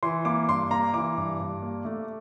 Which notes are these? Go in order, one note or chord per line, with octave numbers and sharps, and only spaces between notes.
E3 C6
A#3 D6
G2 C6
A#3 A#5
E3 D6
G2
G2
A#3
A3